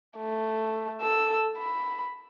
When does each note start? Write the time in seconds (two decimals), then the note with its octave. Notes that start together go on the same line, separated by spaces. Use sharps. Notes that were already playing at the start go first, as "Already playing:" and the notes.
0.18 A3
1.01 A4 E6
1.58 B5